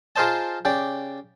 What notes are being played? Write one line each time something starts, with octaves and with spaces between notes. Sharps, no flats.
F4 G#4 A#4 C5 D#5 A5
C#3 G4 D5